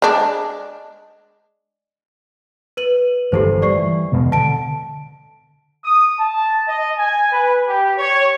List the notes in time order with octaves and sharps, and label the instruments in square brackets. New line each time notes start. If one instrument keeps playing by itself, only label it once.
[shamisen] G#3 D4
[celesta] B4 D#7 F#7
[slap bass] G1 E3 A3 [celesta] G4 A4 C5
[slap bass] E3 G3 [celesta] D5 C#6 C7
[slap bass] D#1 B2 G#3
[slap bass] D3 [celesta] A5 D7
[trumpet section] D#6
A5
D#5
G#5
B4
G4
C#5